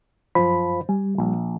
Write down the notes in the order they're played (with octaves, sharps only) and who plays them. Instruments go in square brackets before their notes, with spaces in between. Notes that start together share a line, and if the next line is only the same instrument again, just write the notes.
[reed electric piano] F#2 B5 [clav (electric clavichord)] F3
[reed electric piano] G3 [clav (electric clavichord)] G#5
[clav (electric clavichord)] A#1